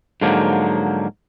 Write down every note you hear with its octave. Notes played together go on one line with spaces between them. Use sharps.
G#2 D3 F3 F#3 A#3